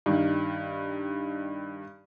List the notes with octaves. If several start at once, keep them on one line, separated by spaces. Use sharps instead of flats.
G2 D#3